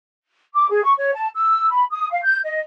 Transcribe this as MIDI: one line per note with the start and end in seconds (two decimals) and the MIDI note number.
0.54 0.69 86
0.70 0.83 68
0.84 0.93 85
0.98 1.12 73
1.14 1.28 81
1.35 1.68 88
1.70 1.84 83
1.91 2.09 87
2.11 2.20 77
2.24 2.38 91
2.44 2.60 75